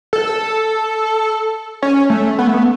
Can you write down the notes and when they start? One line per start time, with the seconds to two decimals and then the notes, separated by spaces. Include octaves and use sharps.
0.13 A4
1.83 C#4
2.10 A3
2.39 B3
2.47 A3
2.54 B3